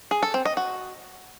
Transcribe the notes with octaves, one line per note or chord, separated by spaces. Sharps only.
G#4
A4
C4
D#5
F#4